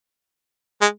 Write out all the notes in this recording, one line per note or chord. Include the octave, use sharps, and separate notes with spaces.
G#3